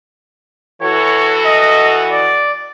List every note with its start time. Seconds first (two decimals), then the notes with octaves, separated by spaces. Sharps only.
0.82 E3 F#4 A4 C#5
1.46 D#5
2.12 D5